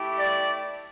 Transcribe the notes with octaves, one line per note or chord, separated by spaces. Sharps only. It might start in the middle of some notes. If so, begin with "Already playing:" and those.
Already playing: A3 E4 G4
D5